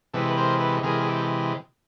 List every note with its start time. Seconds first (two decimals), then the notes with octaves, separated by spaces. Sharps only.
0.14 C3 E3 G#3 A4 B4
0.27 B4
0.37 A#4 C5
0.60 A4 B4
0.83 C3 E3 G#3 G#4 A#4
1.00 G#4
1.06 G4 A4